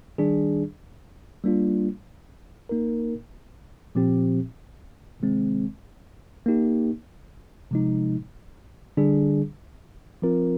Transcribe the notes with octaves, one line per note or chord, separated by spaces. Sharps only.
D#3 G3 D4 G#4
G3 A#3 D4 F4
A#3 D#4 A#4
A#2 F3 C4 G4
C3 D#3 G#3 C4
A#3 D#4 G4
C3 F3 G#3 D#4
D3 G3 D4 G#4
F3 C4 F4 A#4